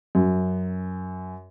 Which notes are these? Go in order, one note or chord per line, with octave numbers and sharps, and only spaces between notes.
F#2